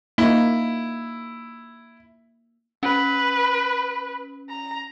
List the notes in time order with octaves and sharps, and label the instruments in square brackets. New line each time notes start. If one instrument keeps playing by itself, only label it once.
[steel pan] A#3 D#4 [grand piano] E4
[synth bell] C#4 [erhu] B4
[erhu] A#5